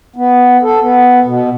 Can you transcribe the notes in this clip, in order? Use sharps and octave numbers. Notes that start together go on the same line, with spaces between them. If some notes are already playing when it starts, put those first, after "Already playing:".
B3
A4
B3
B2